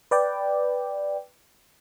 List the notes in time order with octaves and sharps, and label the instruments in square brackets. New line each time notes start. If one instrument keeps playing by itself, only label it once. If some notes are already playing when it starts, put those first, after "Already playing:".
[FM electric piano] B4 D5 G5